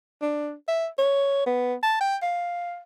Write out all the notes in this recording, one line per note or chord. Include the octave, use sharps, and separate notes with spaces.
D4
E5
C#5
B3
A5
G5
F5